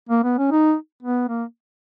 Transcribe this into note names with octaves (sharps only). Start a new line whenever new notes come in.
A#3
B3
C#4
D#4
B3
A#3